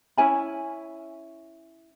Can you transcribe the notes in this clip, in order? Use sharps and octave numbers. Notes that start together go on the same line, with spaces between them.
C#4 E4 G#5 B5